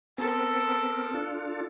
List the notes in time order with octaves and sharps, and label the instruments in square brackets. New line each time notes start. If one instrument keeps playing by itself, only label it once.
[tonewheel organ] B3 C4 A#4 [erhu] A4
[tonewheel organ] D4 F4 A4